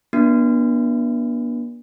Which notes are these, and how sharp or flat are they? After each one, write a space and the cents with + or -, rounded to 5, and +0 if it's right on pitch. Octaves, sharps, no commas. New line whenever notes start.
B3 -45 D4 +0 F#4 -45